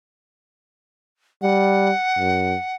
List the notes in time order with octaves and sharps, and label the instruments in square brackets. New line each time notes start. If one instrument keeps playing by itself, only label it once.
[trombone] G3 [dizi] F#5
[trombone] F#2